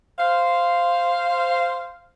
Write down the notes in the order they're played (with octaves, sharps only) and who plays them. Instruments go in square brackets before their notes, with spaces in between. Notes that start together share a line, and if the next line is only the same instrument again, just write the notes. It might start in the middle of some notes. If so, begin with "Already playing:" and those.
[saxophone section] C5 F5